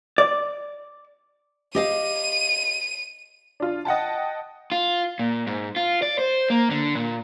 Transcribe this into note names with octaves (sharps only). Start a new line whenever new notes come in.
D5
G4 D#5 F5 D#7
D4 F4
D#5 F#5 G5 A5
F4
A#2
G#2
F4
D5
C5
A#3
D3
A#2